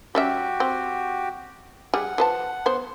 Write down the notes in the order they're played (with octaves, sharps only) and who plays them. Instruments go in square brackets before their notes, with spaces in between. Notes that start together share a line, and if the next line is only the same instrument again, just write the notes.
[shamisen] G3 C#4 E5 [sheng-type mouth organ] F#4 G4
[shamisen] C4
[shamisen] G3 G#4 [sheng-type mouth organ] F#5
[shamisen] F3 B4 A5
B3 C5